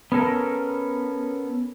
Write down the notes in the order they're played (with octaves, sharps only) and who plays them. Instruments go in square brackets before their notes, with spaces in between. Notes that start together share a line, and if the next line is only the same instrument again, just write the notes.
[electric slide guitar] B3 C#4 A4 A#4